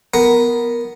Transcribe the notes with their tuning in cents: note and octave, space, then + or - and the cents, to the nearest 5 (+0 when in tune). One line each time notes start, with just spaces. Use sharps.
B3 +0 A#4 +5